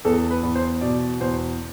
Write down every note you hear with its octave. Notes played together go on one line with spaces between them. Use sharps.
E2 A4
B4
E2
C5
B2 D5
E2 C5